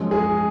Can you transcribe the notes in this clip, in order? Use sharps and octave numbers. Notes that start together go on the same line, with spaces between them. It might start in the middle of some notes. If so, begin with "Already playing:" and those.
Already playing: F#2 F3 G#3
G#4